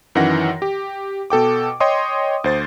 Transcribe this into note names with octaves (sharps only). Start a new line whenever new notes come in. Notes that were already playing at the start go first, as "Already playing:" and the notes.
F#2 D#3 E3 F#5 A#6
G4
B2 A4 G5 D6
C#5 D#5 G5 C6 D#6
D2 C5 A6